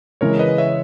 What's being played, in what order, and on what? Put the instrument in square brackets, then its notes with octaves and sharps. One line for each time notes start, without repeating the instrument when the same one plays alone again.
[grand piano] C#3 E3 G#3 [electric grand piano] A#4 C#5
[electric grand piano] B4 D#5
C#5 E5